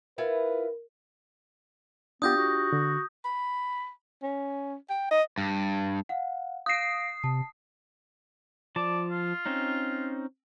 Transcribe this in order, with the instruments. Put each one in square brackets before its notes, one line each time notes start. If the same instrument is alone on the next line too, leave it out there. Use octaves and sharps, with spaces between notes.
[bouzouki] E4 F4 F#5 [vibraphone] A#4 [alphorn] B4
[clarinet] B3 [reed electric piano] D4 F4 G4 [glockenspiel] D#6 G6 A#6
[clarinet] F#4
[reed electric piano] D3
[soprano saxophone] B5
C#4
G5
D#5
[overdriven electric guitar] G2
[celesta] F5 F#5
[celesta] F5 A#6 D7 [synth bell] D#6 C7
[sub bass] C3 [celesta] A5
[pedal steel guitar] F3 A5 [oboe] D5
[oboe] F4
[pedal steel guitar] C4 C#4 D#4